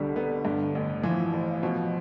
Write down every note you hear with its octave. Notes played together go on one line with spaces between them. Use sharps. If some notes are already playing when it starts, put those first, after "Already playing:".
Already playing: C2 B2 D3 G3
B3
G2
A1
E3 F3
A1
B2 F3